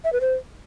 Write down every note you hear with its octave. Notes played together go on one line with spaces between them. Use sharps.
E5
B4
C5